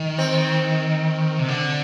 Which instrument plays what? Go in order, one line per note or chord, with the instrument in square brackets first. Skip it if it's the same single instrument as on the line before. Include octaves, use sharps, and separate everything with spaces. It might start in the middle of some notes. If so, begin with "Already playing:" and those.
Already playing: [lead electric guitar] D#3
[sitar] C4
[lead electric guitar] C3
D3